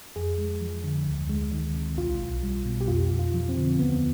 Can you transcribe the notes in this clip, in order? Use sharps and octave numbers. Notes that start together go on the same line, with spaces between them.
F2 G#4
G#3
F3
D3
D2
G#3
D#3
C3
B1 F4
B1
G3
B2
G4
F2 F4
F2
F4
F3
C4
D3
D#2 B3